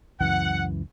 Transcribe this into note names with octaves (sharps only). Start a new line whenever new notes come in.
C#2 F#2 E3 F#5